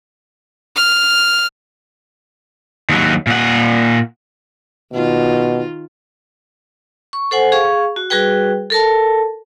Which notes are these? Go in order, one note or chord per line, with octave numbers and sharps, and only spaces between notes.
F6
D#2 F#3
A#2 F#5
B2 D#3 F4
C#6
A4 C5 F#5 G#5
G#4 F5 C#6
F#4
G3 F#4 G#4 B4 G5
A4 A#4 A5